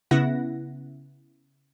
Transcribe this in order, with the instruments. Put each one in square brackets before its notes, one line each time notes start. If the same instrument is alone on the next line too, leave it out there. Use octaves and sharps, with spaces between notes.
[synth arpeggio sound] C#3 B3 E4 F#5 A#6